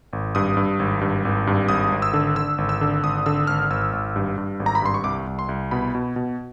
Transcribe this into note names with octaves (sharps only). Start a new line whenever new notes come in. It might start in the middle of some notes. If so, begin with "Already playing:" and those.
G#1
G2 D#6
G2
G#1
G2
G#1
G2
G#1 D#6
G#1
E6
D3
D3 E6
G#1
E6
D3
G#1 D#6
D3 E6
G#1 F6
G#1 E6
G#1
G2
G2
G#1
A#5
B5
G2 C6
C#6
C2 D6
C2
C6
C2
B2 B5
B2
B2